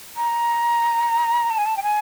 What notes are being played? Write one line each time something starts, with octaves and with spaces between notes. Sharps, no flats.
A#5
A5
G#5
A5
G5
G#5